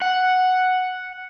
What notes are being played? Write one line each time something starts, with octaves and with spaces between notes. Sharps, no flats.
F#5